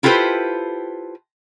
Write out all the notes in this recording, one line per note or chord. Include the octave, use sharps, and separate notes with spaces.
E4 F4 G4 A4 B4 C5